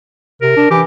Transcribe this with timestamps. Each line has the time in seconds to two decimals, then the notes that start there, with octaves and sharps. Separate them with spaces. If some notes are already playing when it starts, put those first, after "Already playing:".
0.42 C3 A#4
0.56 D4
0.71 E3 G4